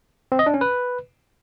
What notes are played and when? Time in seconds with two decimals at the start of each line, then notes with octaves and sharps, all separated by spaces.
0.32 C4
0.39 D#5
0.46 D4
0.54 C#4
0.61 B4